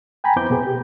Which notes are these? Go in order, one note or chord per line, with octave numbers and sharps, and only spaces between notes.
G5 G#5 A#5 B5
F2 B3 E4 C5 D6 G6
B2 B3 G#4
G4